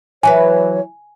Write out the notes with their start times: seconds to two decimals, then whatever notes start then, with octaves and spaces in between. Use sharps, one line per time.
0.23 E3 F#3 B4 C#5 G#5